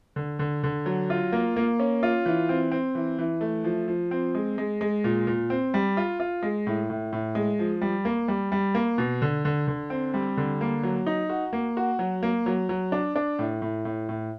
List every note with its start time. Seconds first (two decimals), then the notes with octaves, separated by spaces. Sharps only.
0.16 D3
0.39 D3
0.64 D3
0.86 F#3
1.10 F4
1.32 A#3
1.56 A#3
1.80 C#4
2.03 F4
2.26 E3
2.49 C4
2.72 C4
2.95 E3
3.19 E3
3.41 A3
3.64 F3
3.88 F3
4.11 C4
4.35 G#3
4.58 G#3
4.81 G#3
5.04 A#2
5.27 A#2
5.50 C4
5.74 G3
5.97 F4
6.20 F4
6.42 G#3
6.67 A2
6.90 A2
7.13 A2
7.35 G#3
7.59 F3
7.81 G3
8.05 A#3
8.28 G3
8.52 G3
8.75 A#3
8.98 B2
9.22 D3
9.45 D3
9.68 D3
9.90 C4
10.14 G3
10.37 D3
10.61 A#3
10.83 F#3
11.06 D#4
11.29 F#4
11.53 A#3
11.77 F#4
11.99 F#3
12.23 A#3
12.46 F#3
12.69 F#3
12.92 D4
13.16 D4
13.39 A2
13.62 A2
13.85 A2
14.09 A2